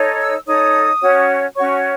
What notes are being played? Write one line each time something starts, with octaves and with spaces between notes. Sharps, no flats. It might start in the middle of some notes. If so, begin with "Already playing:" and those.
Already playing: D#4 A4 C#5
E6
D#4 A4 C#5 D#6
C#4 F#4 C#5
C#4 F#4 C#5 C#6